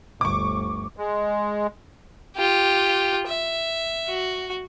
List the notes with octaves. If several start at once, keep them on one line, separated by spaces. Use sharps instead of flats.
G1 D2 C#6 D6
G#3
F4 G4
E5
F#4